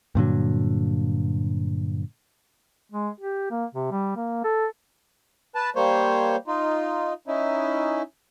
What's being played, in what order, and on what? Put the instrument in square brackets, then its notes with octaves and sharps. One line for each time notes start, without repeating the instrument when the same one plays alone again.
[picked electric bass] G2 A#2 D3 F#3
[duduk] G#3
G4
A#3
C3
G3
A#3
A4
[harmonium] B4 A5
G3 A#3 C5 C#5
D#4 F4
C#4 D#4 E4